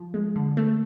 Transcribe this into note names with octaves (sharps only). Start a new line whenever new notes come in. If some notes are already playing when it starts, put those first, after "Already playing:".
Already playing: F3
G#3
D3
A3